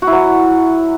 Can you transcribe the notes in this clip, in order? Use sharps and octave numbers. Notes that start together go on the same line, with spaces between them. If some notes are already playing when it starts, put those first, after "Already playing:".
F#4
E4
F#3